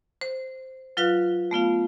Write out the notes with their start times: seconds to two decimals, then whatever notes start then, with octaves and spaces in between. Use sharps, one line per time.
0.21 C5
0.97 F#3 F4 B4 F5 F#6
1.51 A3 B3 F4 F5